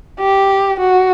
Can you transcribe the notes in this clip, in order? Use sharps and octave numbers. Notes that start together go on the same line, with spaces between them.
G4
F#4